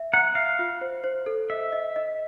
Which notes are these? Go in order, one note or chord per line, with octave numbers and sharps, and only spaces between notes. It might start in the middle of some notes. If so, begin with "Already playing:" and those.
Already playing: E5
F#5 A#5
E5 F5
F4
C5
C5
A4
D#5 E5
D#5
D#5